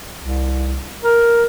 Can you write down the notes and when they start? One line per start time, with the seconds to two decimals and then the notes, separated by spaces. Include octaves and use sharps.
0.19 C2
1.03 A#4